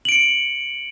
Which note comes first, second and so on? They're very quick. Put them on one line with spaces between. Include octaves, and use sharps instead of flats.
F#7 D7 C#7